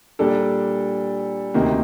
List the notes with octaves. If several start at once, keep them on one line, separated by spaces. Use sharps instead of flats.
A#2 G3 D4 A4
D2 C3 D#3 A#3